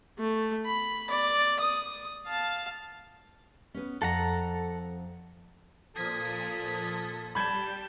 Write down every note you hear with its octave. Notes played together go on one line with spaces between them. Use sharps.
A3
B5
D5
D#6
F5 A5
B3 C#4
F2 A4 F#5 A#5
A#2 F3 A4 D#6 G#6 B6
G3 A5 B5 G6 G#6